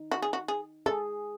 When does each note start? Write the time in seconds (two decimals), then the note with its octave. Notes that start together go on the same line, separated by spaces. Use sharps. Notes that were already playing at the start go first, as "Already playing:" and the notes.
Already playing: D#4
0.11 F#4
0.22 G#4
0.33 F#4
0.48 G#4
0.86 G#4 A4